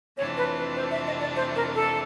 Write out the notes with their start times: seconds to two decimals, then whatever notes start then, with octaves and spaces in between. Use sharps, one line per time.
0.18 F2 C3 E3 A3 D4 C#5
0.37 B4
0.57 B4
0.76 C5
0.91 E5
1.07 D#5
1.21 D5
1.36 C5
1.56 A#4
1.75 A4